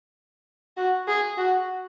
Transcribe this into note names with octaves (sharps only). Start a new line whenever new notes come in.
F#4
G#4
F#4